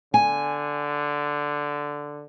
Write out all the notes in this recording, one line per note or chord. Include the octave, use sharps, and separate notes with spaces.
D3 G#5